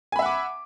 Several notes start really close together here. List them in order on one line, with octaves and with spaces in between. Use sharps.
G#5 B5 E5 F#5 D6